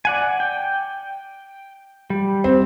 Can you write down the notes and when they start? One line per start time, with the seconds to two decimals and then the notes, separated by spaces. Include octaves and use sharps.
0.05 D5 F#5 G#5
0.40 G5
2.10 G3
2.44 C4